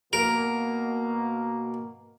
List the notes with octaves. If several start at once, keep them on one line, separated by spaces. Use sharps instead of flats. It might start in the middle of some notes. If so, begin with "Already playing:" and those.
B2 A#3 A#4